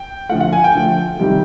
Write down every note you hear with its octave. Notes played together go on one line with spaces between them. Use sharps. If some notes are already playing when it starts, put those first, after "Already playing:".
Already playing: G5
D3 F3 A3 F#5
F#5
G#5
G5
D3 F3 A3
C3 D#3 G3